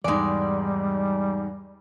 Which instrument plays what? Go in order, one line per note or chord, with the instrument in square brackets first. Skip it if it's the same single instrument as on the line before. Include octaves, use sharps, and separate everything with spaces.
[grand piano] E2 G#2 [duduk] G3 [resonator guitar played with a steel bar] G#3 D5